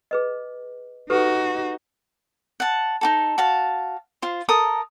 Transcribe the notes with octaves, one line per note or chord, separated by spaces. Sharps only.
G#4 B4 D#5
D#4 F#4 G4 A4 B4
F#5 A5
D#4 F#4 A4
F#4 F5 A5
F4 C5
A4 A#4 D#6